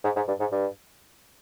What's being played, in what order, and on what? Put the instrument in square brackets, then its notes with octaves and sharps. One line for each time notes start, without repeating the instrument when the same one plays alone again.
[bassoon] G#2
G#2
G2
G#2
G2